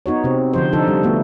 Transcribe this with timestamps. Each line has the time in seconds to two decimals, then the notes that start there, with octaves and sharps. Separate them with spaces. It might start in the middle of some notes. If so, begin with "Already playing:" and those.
0.06 B3 D#4 F#4 C#5
0.24 C3 C4
0.53 D3 F3 C5
0.73 D3 F3 D4 D#4 A4
0.88 G3
1.03 A3 B3 F#4